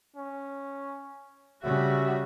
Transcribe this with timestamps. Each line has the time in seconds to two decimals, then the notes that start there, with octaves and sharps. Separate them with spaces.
0.16 C#4
1.63 C#3 G3 F#4 E5